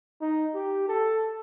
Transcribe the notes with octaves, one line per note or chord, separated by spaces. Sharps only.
D#4
G4
A4